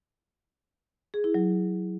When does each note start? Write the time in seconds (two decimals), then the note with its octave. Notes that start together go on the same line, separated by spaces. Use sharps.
1.14 G#4
1.24 E4
1.34 F#3